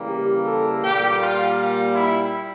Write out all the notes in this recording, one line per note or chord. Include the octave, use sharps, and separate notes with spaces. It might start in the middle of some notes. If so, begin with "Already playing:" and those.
Already playing: C#3 E3 G3 A#3
G4
A4
A#2 G3 A#3 G4
F4
E4